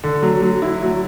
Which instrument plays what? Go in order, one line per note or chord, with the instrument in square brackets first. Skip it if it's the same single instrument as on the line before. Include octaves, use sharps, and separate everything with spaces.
[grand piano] D3
F#3
F#3
E4
F#3